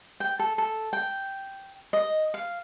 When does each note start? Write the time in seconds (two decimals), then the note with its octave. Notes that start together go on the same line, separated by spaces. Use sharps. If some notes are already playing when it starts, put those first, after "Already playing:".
0.20 G5
0.39 A4
0.58 A4
0.93 G5
1.93 D#5
2.34 F5